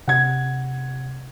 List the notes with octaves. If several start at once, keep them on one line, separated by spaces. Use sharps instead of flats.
C3 F#5 G#6